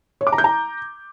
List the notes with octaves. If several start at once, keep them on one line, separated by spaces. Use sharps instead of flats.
C#5
D6
A#5
G6
A#5